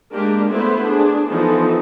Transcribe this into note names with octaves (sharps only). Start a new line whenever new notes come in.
G#3 A#3 D4 G4 A#4
A3 B3 E4 B4 C5
D4 G#4
E3 F3 B3 D#4 A4